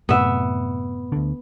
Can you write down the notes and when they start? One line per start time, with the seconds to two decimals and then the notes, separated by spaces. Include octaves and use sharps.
0.09 F#2 A2 C3 B3 E5
1.12 D2 D3